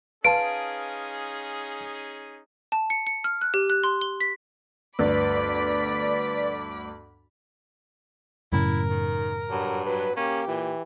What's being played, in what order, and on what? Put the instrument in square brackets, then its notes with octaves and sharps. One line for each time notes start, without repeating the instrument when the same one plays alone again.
[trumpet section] C#4 D#4 G#4 [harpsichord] F4 [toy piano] B4 A5 [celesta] D7
[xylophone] A5
C#7
C#7
F6
F#6
G4
F#6
C6
G7
B6
[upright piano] G1 D2 [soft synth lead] B4 [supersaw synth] D5 B6 [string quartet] B5 D6
[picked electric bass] F#2 A2 C#3 [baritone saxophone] E4 [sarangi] A#4
[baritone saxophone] D#3
[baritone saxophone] G2 [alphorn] F#3
[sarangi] F#3 [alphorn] B4
[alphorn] A#3 [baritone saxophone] C#4 [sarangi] G4
[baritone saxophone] A#2 [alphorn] E3